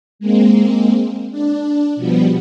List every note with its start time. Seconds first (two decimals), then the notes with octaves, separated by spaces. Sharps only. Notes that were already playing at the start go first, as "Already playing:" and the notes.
0.19 G#3 A#3 C4
1.30 D4
1.96 B2 F3 G3 B3